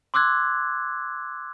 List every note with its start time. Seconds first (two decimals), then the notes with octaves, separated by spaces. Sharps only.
0.14 C6 D6 E6 F#6 G#6